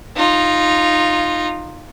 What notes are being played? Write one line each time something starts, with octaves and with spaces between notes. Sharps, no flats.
D#4 F4